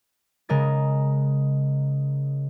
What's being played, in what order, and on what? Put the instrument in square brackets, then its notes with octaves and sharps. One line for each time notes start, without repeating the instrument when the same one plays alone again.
[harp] C#3 G#3 A#4 D#5 A6